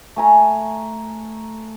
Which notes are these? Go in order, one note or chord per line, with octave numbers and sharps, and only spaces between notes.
A3 G#5 A#5